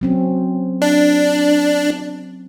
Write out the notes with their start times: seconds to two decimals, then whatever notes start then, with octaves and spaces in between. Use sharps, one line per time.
0.01 F#3 C4 C#4
0.82 D4